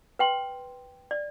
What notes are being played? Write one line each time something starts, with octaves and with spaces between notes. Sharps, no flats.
B4 G5 C6
D5